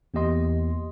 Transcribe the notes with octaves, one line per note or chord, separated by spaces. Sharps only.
E2 A#3 G4 D#5 C6